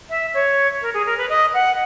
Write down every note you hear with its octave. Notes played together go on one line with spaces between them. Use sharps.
E5
C#5
A#4
G#4
A#4
B4
D#5
F#5